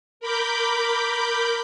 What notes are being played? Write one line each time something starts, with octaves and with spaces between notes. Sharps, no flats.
A#4 B5 D6 G6